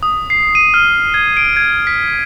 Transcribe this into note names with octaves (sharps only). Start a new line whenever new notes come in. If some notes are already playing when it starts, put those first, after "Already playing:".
D#6
C7
D#7
F6
G#6
D7
G#6
B6